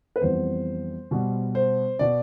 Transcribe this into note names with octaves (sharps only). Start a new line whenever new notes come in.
B4
F2 E3 G3 B3 C5
B2 G3 B3
C5
B2 B3 D5